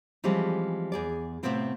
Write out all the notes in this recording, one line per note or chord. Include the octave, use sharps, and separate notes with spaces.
E3 F3 G3 G#3 C4 C#4
E2 G#4 D5
A2 C3 G#3 B3 C4 F4